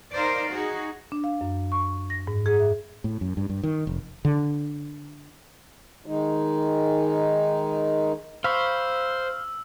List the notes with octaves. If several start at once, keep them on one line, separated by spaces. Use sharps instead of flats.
D#4 A#4 C5 D5 F5
D#4 F#4 G#4
D4
F5
F#2
C#6
A#6
G#2
G#4
E5
A2
F#2
G2
G2
D#3
F1
D3
D#3 G#3 D#4
C5 F5 B5 C#6 E6